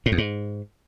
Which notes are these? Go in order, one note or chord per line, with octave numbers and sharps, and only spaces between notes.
A2
E2
G#2